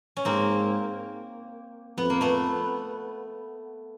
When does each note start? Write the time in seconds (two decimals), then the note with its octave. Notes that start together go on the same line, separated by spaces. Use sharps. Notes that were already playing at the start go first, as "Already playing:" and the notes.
0.17 C#4
0.25 G#2 A#3 C4
1.98 F2 B3
2.10 A#3
2.21 A3 B3